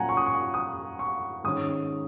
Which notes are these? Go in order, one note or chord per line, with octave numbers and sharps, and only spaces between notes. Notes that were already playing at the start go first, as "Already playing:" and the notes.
Already playing: A#2 F#3 C#4 F#5 G#5 A#5
C#6
D#6
C#6
D#6
C#6
G#2 D#3 G#3 C#4 D#6